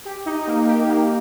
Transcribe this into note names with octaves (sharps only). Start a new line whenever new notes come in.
G4
D#4
A#3
G4
A#3